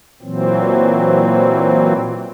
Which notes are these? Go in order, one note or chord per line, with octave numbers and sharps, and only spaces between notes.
A#2 E3 F#3 C4